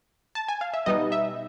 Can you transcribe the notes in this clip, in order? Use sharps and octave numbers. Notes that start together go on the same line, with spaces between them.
A5
G#5
F5
E5
B2 G3 B3 D#4 D#5
E5